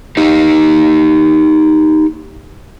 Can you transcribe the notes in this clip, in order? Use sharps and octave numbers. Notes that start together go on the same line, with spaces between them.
D#4 G4 D#5